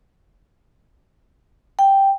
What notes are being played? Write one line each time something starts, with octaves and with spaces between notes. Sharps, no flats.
G5